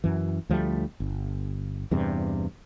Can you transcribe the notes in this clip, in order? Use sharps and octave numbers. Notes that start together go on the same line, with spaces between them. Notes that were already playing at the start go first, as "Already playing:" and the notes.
F#2 E3
D2 F3 G3 A3
G1
E2 G2 C3